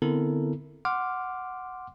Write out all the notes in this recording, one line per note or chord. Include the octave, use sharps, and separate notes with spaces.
D3 B3 C4 E4 A4 A#4
F#5 C6 D6 F6